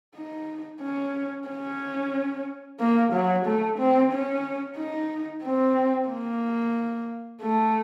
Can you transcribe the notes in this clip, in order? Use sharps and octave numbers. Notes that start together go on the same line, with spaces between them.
D#4
C#4
C#4
A#3
F#3
A3
C4
C#4
D#4
C4
A#3
A3